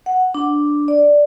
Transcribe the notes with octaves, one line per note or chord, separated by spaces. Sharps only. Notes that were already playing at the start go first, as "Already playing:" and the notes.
F#5
D4
D5